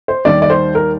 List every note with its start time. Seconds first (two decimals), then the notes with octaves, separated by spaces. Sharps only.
0.08 C5
0.25 D#2 D#3 G3 D5
0.42 D5
0.50 C5
0.75 A#4